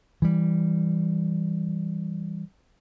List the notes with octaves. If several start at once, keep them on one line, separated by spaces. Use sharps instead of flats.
E3 G3